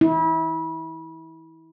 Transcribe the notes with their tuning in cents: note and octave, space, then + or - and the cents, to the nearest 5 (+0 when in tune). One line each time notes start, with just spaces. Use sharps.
E4 -30